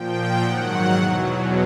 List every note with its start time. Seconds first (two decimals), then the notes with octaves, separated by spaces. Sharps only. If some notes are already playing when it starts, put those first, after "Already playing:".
Already playing: A#2 F3 G5
0.41 G#2 D#3 F#3 F#5
0.95 E2 B2 F#3